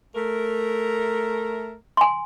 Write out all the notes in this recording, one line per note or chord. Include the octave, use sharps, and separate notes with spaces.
A3 A#4
G#5 C6